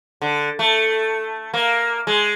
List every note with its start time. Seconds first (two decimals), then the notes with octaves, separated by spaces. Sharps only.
0.22 D3
0.59 A3
1.54 A#3
2.07 G#3